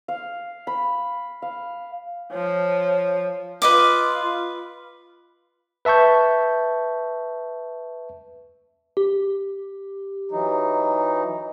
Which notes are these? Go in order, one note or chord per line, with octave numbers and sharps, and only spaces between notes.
F5
B5
F5
F3 C#5
F4 B4 D#5 D6
B4 E5 A5 C#6 G6
G4
E3 F#3 D#4